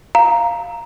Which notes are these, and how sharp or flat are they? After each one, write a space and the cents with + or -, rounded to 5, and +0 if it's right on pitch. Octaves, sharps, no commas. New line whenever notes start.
F5 +0 A#5 +0